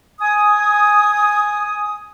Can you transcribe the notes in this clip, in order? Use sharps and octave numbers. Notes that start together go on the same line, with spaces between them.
G#5 D#6